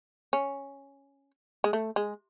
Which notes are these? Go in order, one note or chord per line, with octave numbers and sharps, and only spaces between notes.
C#4
G#3
A3
G#3